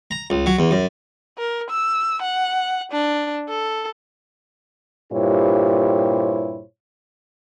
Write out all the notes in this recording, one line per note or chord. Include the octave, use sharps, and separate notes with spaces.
A#5
C#2
F#3
E2
F#2
A#4
E6
F#5
D4
A4
G2 A#2 E4 G4 C5 C#5